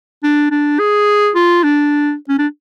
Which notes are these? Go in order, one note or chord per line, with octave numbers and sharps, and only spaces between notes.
D4
D4
G#4
F4
D4
C#4
D4